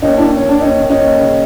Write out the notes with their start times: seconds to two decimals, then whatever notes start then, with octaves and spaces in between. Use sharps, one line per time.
0.02 D#2 C#4 D#4
0.17 D#2 D4 E4
0.35 C#4
0.41 D#2
0.49 D4
0.60 D#2 C#4 D#4
0.80 D#2
0.90 C#4 D#4
0.99 D#2
1.20 C#3